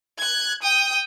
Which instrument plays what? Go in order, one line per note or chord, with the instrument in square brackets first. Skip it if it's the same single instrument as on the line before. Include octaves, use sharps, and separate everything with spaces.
[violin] F#6 G#6
G5 D#6